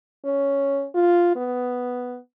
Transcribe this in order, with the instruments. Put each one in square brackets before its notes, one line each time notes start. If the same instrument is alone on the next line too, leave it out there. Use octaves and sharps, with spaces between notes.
[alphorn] C#4
F4
B3